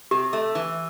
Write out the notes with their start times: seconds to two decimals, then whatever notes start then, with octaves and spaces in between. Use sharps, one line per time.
0.11 C3 G4
0.33 A3
0.55 E3